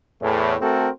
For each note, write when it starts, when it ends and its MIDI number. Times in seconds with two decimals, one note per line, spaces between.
0.22 0.54 40
0.22 0.54 45
0.61 0.89 57
0.61 0.89 60
0.61 0.89 66
0.61 0.89 69
0.61 0.89 70